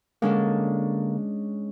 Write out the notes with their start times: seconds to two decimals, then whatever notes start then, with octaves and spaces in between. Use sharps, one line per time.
0.22 D3 G#3 A#3 C#4 D4